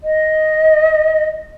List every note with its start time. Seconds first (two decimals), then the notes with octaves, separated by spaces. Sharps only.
0.04 D#5